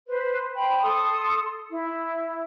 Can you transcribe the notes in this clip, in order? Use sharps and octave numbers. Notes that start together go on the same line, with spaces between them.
B4 C5
C5 G5 B5
A4 C6 D#6
E4